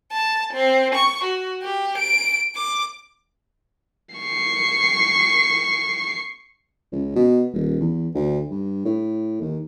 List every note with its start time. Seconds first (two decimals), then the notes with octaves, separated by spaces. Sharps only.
0.12 A5
0.53 C4
0.95 C#6
1.24 F#4
1.63 G4
1.98 D7
2.56 D6
4.15 C#6 C7
6.92 C#2
7.16 B2
7.53 D#1
7.80 E2
8.14 D2
8.51 G2
8.85 A2
9.41 D#2